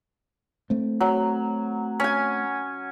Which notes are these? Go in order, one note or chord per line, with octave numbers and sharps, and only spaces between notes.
A3 C4
F#3
C#4 G#5